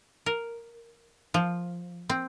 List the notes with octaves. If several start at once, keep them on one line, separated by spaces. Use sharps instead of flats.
A#4
F3
C4